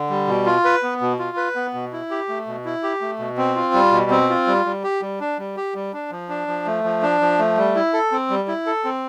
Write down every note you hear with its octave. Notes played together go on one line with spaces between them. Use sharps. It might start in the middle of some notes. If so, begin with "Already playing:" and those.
Already playing: D3
G3
B2
F4
B4
B3
B2
F4
B4
B3
B2
E4
G4
A3
B2
E4
G4
A3
B2
C4
F4
G3
B2
C4
F4
G3
G3
G4
G3
D4
G3
G4
G3
D4
F3
D4
F3
A3
F3
D4
F3
A3
G3
E4
A4
C4
G3
E4
A4
C4